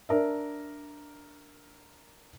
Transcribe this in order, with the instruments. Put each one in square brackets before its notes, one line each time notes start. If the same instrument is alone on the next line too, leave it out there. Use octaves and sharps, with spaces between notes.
[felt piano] D4 A#4 E5